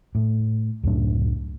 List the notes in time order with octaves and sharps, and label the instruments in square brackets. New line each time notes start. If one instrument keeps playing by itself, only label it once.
[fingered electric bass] A2
C#2 F#2 A2 D4